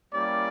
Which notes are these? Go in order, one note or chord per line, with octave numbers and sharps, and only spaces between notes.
G3 A#3 C#4 E4 G4 D5